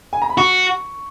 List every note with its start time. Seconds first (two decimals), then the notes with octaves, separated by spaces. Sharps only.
0.13 G#5
0.22 A#5
0.30 B5
0.38 F#4 C#6